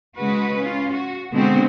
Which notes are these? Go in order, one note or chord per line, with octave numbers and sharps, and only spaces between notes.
C#3 G#3 F#4 B4
C#4 F4
F#4
B2 D3 G#3 B3 C4 F#4